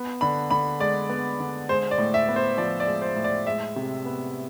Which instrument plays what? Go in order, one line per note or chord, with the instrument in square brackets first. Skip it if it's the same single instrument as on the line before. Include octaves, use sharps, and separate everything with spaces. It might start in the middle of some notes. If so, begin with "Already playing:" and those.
Already playing: [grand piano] B3
D3 B5
D3 B5
G#3 D5
B3
D3
G#3 C5
D5
A2
E5
B3
C5
F3 D5
D5
G#3
C5
A2
D5
G#3 E5
C3
B3